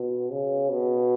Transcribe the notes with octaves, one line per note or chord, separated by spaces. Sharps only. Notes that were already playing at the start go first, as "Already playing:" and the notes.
Already playing: B2
C#3
B2